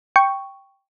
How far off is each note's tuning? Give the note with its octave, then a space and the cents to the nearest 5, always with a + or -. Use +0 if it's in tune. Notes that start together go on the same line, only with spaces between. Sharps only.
G5 +0 C#6 +0